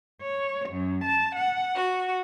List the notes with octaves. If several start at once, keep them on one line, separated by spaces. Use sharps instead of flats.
C#5
F#2
A5
F#5
F#4